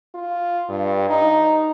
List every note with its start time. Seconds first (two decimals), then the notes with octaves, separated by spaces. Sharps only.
0.14 F4
0.69 G2
1.09 D#4